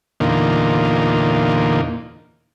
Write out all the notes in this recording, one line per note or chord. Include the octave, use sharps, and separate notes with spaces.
E2 A#2 D3 A#3 D#4 F4